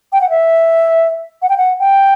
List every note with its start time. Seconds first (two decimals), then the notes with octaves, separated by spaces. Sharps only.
0.13 G5
0.21 F#5
0.30 E5
1.42 F#5
1.49 G5
1.57 F#5
1.80 G5